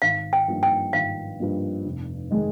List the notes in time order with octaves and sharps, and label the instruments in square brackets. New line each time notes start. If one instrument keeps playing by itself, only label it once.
[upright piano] G#1 [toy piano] F5
[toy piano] G5
[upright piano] G2 F3 A#3 D#4
[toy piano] G5
[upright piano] G#1 [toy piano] F5
[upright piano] G2 F3 A#3 D#4
F1
D#3 G#3 D#4